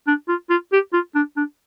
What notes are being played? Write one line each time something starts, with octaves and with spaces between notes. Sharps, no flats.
D4
F4
F4
G4
F4
D4
D4